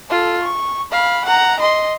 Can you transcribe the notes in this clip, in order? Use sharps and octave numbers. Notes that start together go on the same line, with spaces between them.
F4 A4
C#6
F5 B5
F#5 A#5
D#5 C6